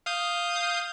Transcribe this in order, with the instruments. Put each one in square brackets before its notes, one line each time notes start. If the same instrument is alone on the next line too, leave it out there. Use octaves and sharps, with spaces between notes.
[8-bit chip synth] F5 D#6 G6